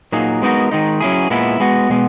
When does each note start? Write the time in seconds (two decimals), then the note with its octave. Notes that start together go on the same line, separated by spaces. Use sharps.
0.12 A#2 F#3 A#3 D#4 G#4
0.42 G#3 B3 D#4 F#4 A#4
0.71 D#3 G#3 D#4
1.01 F#3 C#4 E4 G#4
1.30 A#2 G#3 B3 E4
1.60 G#3 B3 F#4
1.89 B2 G#3 B3